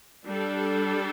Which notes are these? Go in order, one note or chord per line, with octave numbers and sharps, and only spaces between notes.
G3 D4 A4